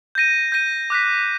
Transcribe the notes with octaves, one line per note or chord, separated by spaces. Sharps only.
G6 A#6 D#7
G6 A#6 D#7
D6 F#6 B6